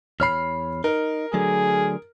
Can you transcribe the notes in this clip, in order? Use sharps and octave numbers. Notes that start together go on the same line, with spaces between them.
E2 C#5 B5 F6 C7
D#4 A#4
D3 F#3 A3 G#4